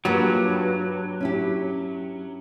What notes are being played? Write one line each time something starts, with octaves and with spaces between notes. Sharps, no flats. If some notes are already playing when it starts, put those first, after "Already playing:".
G2 F#3 A#3 F4 G4
C#4 E4 G4